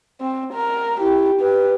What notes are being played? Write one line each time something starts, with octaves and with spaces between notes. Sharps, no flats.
C4
A#4
E4 G4
G4 B4